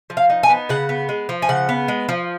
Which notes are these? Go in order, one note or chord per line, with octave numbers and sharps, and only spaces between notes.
F3
F5
D#4
G#5
B3
C#3 F#5
B3
G#3
F3
G#5
C#3 F#5
B3
G#3
F3